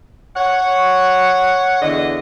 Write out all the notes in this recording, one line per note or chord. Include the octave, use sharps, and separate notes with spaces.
C#5 F#5
E2 D3 D#5